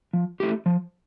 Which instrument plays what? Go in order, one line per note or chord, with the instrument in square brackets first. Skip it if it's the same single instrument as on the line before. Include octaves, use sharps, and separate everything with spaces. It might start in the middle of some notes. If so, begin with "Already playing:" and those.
[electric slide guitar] F3
A3 E4 G4
F3